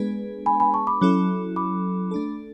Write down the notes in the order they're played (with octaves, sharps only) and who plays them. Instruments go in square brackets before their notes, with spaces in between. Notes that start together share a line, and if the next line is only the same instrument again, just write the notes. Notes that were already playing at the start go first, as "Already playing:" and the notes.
Already playing: [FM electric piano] G#3 B3 D4 G#4 B4
[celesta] G#5 B5
G#5 B5
A5 C#6
B5 D6
[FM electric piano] F#3 C#4 E4 A4 [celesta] B5 D6
[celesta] B5 D6
[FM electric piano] A3 D4 A4